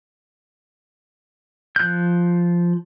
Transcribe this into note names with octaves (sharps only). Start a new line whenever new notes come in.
F3 F#6 G6